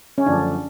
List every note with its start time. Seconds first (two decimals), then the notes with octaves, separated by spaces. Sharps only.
0.18 C#4
0.26 F#2 D3 F3 A3 D4